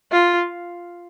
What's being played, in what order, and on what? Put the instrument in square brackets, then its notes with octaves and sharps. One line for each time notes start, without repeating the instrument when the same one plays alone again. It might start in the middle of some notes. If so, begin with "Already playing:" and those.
[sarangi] F4